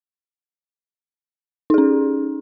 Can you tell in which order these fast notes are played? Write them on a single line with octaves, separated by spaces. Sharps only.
D#4 G#4 C#4